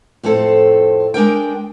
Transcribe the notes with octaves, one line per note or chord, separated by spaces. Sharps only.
F2 A2 C4 A4
G#3 D4 A#4 G5